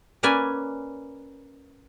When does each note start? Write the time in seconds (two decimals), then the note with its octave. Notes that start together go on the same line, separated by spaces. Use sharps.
0.23 A#3 C#4 B4 D5 G#5